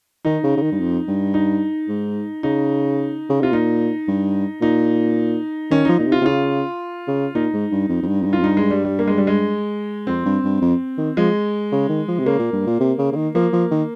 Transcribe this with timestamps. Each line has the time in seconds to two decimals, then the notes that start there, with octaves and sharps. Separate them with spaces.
0.25 D#3 D#4
0.44 C#3
0.57 C#3
0.62 D#3
0.71 G2
0.80 F2
1.08 G2
1.34 D#4
1.88 G#2
2.43 C#3 D#4
3.29 C#3
3.41 C3 F4
3.52 A#2 D#4
4.08 G2
4.61 A#2 D#4
5.70 D#3 C#4
5.85 F3 D#4
5.98 A#2 D#4
6.07 C3
6.12 F4
6.21 C3
6.25 C#3 F4
7.08 C#3
7.35 A#2 D#4
7.53 G#2
7.71 G2
7.89 F2
8.03 F2
8.07 G2
8.22 F2
8.26 G2
8.33 F4
8.39 F2
8.43 G2 D#4
8.57 G#3
8.70 G3
8.85 G3
8.99 A#3
9.08 G#3
9.18 G3
9.27 G#3
10.07 F2 C4
10.25 G2
10.44 G2
10.61 F2
10.98 D#3
11.17 F3 G#3
11.72 C#3
11.89 D#3
12.08 F3
12.19 C3
12.26 C#3 A#3
12.39 A#2
12.52 G2
12.67 A#2
12.80 C3
12.98 C#3
13.12 C#3
13.16 D#3
13.35 F3 A#3
13.53 F3
13.71 D#3